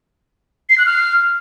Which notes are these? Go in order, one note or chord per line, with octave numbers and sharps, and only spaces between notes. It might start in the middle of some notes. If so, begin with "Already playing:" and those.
C7
F#6
F6